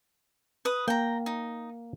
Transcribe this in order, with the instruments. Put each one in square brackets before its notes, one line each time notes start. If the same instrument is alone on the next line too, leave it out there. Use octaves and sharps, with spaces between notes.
[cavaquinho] B4 D#6
[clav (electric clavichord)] A#3 [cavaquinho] G5 A#5
[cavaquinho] D#4